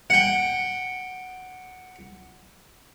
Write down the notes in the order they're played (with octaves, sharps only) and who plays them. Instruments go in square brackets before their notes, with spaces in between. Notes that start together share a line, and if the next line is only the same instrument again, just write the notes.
[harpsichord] F#5 G5